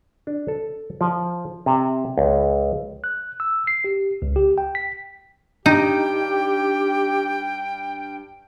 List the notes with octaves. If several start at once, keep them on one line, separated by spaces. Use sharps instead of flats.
D4
A4
F3
C3
C#2
F#6
E6
C7
G4
C#2
G4
G5
B6
G2 D#4 G4 G5